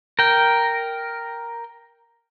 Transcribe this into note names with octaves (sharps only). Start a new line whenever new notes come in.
A#4 G5